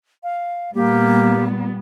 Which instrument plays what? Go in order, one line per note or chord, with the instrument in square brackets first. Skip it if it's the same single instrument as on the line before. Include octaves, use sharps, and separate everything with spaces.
[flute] F5
[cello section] A#2 G3 B3 [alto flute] A#3 [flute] G4